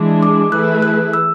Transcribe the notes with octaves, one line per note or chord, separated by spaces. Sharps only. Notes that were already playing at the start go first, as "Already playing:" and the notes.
Already playing: E3 G#3 D4 G#4
D6
E3 A3 E4 G#4 B4 F#6
F#6
E6